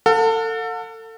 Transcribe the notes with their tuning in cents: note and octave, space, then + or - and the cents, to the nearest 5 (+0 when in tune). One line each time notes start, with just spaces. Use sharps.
A4 +30 F#5 -45